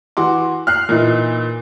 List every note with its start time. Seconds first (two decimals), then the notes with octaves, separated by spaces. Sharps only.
0.17 E3 F#4 C6 D6
0.67 F6 F#6 C7
0.89 A#2 E3 D#4 E4